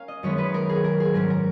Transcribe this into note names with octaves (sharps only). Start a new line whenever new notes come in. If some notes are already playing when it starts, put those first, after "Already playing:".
Already playing: A#3 C#4 F5 G#5
D#5
F#2 D#3 G#3 B3 C#5
B4
A#4
G#4
A#4
G#4
G#2 F#3 C#4 A#4
A#4